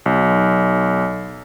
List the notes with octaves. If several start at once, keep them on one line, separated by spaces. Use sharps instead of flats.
B1